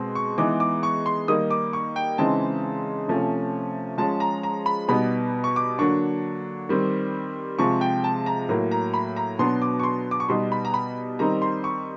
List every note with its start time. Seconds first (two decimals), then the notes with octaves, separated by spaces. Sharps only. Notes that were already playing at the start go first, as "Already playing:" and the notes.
Already playing: B2 G#3 C4
0.15 C#6
0.38 E3 G#3 B3 D#4 D6
0.60 D6
0.83 C#6
1.06 C6
1.28 D#3 G3 A#3 D#4 D#6
1.51 D6
1.73 C#6
1.96 G5
2.18 C#3 E3 G#3 C4 D#4 A5
3.08 C3 F3 A3 C#4
3.98 F3 G#3 C#4 A5
4.20 A#5
4.43 A#5
4.66 B5
4.88 B2 G3 B3 D#4 B5
5.44 C#6
5.56 D6
5.79 D3 F#3 A#3 D4 C#6
6.69 D#3 G3 C4
7.59 C3 F3 G#3 C#6
7.81 G5
8.04 A5
8.26 A#5
8.49 A2 F#3 A#3
8.71 A#5
8.94 B5
9.16 A#5
9.39 B2 F#3 B3 D4 C6
9.62 D6
9.80 C#6
9.83 C6
10.11 D6
10.20 C#6
10.29 B2 G3 B3 D#4 C6
10.52 B5
10.65 A#5
10.74 B5
11.19 D#3 G3 C4 D#4 A#5
11.42 C6
11.64 C#6